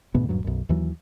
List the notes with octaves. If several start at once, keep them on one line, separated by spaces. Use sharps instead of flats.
D2 G#2 B2 B3
D#1 G2 F#3
B1 F#2
D#2 E3 F#3